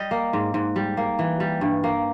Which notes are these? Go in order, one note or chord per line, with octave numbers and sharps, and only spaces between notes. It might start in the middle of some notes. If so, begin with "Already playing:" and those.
Already playing: G3 D#5
A#3
G#2
G#2
G3
A#3
E3
G3
G2
A#3